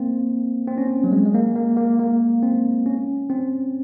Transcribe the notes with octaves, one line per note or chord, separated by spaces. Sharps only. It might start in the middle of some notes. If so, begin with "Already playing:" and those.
Already playing: A#3 C4
C4
C#4
C4
F#3
G#3
G#3
A#3
A#3
A#3
A#3
C4
C#4
C4